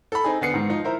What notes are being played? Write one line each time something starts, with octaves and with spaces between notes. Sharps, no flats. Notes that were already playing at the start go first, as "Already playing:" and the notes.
A4 B5
C4 D#4 G#4
D3 B3 C7 C#7
G#2 D#3
F3 D#4
E4 A#4 C5